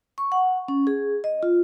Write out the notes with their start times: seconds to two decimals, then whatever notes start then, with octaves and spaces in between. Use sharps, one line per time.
0.18 C#6
0.32 F#5
0.68 C#4
0.87 G#4
1.24 D#5
1.43 F4